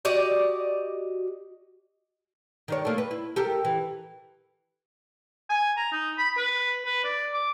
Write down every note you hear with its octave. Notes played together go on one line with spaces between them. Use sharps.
F#4 G4 D5 D#5
D#3 D4 C#5
A3 A#3
B4
E4
G4 A4 A#4
E3
G#5
A#5
D#4
B5
B4
B4
D5
D6